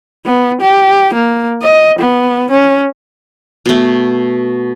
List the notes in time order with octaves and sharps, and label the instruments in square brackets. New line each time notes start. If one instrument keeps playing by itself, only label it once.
[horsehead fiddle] B3
G4
A#3
D#5
B3
C#4
[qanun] B2 A3